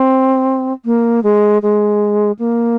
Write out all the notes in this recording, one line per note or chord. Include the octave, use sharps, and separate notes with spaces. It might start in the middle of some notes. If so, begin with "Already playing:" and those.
Already playing: C4
A#3
G#3
G#3
A#3